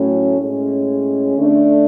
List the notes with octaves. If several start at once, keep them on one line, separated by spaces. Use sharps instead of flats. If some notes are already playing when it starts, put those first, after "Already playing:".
Already playing: A2 F#3 A3 C#4
A2 G#3 C#4
D3 A3 D4